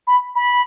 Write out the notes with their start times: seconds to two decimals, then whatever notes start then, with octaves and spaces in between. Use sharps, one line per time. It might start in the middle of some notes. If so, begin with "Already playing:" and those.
0.07 B5
0.35 B5